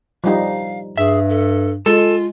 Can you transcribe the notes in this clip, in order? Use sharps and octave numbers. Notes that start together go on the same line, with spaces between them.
F3 G3 D#4 F5
G2 G#4 E5
A4
G#3 F4 A4